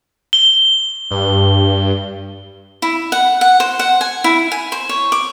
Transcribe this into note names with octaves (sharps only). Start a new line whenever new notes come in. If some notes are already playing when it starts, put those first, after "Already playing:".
G7
G2
E4
F#5
F#5
C5
F#5
G#5
E4
G#5
C5
C#5
D6